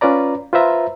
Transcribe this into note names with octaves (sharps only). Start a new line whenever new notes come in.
C#4 F4 B4 D5 A#5
F4 B4 C5 E5 A#5